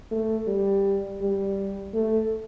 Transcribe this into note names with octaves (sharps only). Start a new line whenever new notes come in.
A3
G3
G3
A3